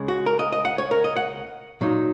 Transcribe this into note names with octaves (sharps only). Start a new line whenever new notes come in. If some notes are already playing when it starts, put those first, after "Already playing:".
Already playing: C#2 C#3 G#3
F#4
A#4
D#5
D#5
F#5
C#5
A#4
D#5
F#5
A#2 F#3 D#4